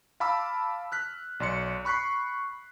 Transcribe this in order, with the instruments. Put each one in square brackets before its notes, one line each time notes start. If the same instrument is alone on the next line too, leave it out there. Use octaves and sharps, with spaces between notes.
[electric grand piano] F5 A5 B5 D6 E6
F6 F#6 B6
B1 D5 C6 C#7
B5 C#6 F#6 B6 C7